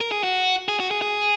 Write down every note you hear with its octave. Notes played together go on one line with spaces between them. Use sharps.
A#4
G#4
F#4
G#4
F#4
G#4
G#4